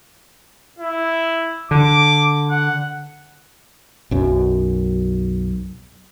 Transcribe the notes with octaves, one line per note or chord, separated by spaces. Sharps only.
E4
D3 D6
F#5
B1 F#2